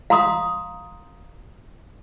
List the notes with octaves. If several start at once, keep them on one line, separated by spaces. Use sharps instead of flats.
F5 A#5 C6 D#6